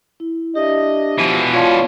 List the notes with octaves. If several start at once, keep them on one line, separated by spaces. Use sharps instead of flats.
E4
D4 G4 D#5 E5
B2 E3 F3
F4 C#5 D5 A5